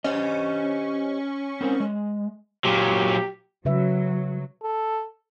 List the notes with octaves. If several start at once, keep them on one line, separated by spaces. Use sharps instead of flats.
C#4 G4 C5 D#5
C4 A#4 C5
G#3
A#2 F#3 G4
C#3 F#3 B4 E5
A4